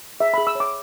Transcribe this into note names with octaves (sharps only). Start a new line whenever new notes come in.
G#4 E5
G#4 B5
E6
C#5 D6